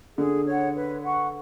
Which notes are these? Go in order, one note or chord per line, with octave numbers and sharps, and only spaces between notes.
D3 G#4
C#5 F#5
B4
F#5 C#6